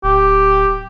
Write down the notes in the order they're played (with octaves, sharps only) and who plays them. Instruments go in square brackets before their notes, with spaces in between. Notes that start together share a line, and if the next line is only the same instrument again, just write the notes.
[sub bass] D1 [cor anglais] G4